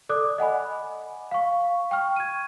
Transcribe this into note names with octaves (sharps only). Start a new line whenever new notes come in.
A4 D5 D6 D#6 F#6
D#5 F#5 G#5 B5
F5 C#6
G5 C#6 F6
G#6 D#7